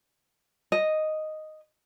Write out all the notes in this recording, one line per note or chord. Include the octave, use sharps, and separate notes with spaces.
D#5